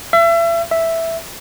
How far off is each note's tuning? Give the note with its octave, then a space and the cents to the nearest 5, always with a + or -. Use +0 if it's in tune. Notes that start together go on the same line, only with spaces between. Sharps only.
E5 +35
E5 +0